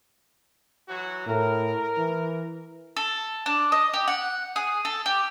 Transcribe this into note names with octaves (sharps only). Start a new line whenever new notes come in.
E3 F#3 F#4
A2 A#4
E3
A4
D4
D#5
G4
F#5
G#4
A4
G4